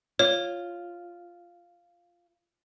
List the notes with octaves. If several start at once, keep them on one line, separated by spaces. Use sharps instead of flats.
F4 C#5